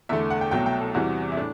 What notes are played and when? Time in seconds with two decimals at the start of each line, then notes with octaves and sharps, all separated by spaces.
0.09 E2 D3 A3 E5
0.30 F#5
0.41 G5
0.51 C2 B2 F#3 A3 G5
0.66 G5
0.81 A4
0.94 E2 C3 E3 G3 F#4
1.32 E4
1.37 A2 D4